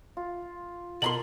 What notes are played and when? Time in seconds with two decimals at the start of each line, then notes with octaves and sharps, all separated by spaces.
0.17 F4
1.02 B2 A4 A#4 A#5 C6 F#7